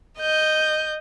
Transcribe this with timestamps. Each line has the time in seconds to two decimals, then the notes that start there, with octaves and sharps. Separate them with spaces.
0.19 D#5 G6